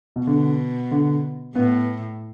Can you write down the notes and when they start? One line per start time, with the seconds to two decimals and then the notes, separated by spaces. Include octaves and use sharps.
0.16 B2
0.27 B2 D3
0.91 D3
1.55 A2 B3